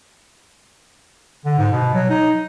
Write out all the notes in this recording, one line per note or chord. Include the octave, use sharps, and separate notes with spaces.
D3
G#2
B2
F#3
D#4